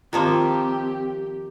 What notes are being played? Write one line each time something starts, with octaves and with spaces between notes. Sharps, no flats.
D#3 F3 A#3 C4 F4 G4 A5 C6